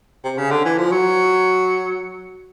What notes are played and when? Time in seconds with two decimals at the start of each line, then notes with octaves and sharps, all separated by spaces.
0.24 C3
0.38 C#3
0.51 D3
0.65 E3
0.78 F3
0.92 F#3